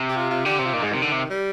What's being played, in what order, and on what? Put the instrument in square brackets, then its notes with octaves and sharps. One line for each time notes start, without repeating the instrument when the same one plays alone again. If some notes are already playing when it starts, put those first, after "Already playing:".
Already playing: [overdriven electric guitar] C3
[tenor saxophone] G4
F4
F4
[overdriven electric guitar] D3 [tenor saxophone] G4
[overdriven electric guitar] C3
[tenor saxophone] F4
[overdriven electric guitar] A#2 [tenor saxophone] D#4
[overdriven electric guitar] G#2 [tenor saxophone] G#3
[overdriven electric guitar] C3 [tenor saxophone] D#3
[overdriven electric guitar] D3
C3
[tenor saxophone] G3